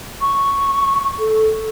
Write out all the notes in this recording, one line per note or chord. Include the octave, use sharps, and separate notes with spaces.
C#6
A4